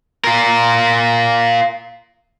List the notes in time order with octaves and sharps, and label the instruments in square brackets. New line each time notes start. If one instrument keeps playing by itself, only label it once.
[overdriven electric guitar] F4 A#4